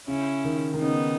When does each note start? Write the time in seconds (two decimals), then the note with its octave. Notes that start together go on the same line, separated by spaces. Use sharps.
0.08 C#3 C#4 E4
0.45 D#3
0.74 D#3
0.81 C#3 B3 D#4